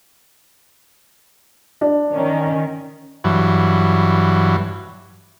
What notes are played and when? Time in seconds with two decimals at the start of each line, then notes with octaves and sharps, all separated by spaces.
1.81 D4
2.14 D#3 C#4
3.24 G2 E3 F#3